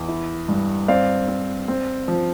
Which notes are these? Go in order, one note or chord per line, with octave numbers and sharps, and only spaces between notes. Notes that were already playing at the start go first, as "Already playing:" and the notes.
Already playing: E2
E4
G2
C4 D5 F5
C4
C4
F3